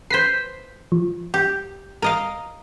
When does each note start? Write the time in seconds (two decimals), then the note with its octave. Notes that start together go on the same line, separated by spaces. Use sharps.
0.10 B4 C5 G6 B6 C7
0.92 F3
1.34 G4
2.02 A#4 D#5 F5